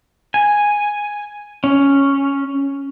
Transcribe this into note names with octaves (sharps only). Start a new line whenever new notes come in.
G#5
C#4